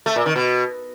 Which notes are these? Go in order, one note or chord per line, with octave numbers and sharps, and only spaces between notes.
A3
A#2
D#3
B2